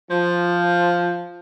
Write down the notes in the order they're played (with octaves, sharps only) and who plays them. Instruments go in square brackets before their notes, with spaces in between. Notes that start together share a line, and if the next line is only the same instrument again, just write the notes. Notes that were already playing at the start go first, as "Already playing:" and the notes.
[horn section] F3